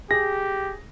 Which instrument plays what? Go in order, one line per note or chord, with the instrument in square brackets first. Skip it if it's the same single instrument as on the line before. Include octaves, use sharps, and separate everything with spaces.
[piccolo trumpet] G4 [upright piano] G#4 [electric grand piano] A#6